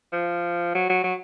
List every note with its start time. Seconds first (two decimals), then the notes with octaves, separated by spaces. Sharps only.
0.13 F3
0.75 F#3
0.90 F#3
1.04 F#3